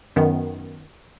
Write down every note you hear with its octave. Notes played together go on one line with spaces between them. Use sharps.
F#2 D#3 B3